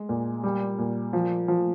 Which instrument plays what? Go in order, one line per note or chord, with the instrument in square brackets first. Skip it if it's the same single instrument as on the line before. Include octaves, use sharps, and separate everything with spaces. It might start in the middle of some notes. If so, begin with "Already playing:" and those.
Already playing: [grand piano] G#3
A#2
G3
A#2
F3
F3